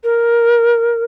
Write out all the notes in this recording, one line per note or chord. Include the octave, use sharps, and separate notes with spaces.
A#4